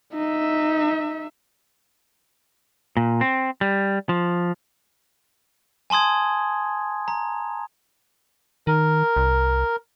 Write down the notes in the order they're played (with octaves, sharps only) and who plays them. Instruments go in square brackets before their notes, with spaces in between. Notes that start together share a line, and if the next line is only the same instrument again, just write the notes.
[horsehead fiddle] D#4 E5
[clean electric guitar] A#2
C4
G3
F3
[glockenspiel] G#5 A5 C6 D#6 G#6
A#5
[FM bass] D#3 [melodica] A#4
[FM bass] C2